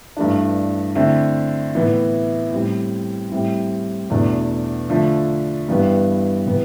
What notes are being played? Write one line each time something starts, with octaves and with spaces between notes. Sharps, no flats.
G2 E3 A3 D4
D3 A3 C4 E4
A2 E3 B3 E4
A2 G3 C4
A2 G3 C4 E4
E2 B2 A3 D4
D3 F3 A3
G2 E3 G3 B3
C3 E3 B3